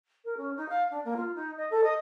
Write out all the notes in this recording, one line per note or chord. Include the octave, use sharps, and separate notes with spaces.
A#4
C#4
D#4
F5
D4
A#3
F4
D#4
D#5
A4
D#5